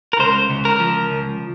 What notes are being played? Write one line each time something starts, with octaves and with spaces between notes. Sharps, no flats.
A#4
C#2 C5
C#2
A#4
F3
C#2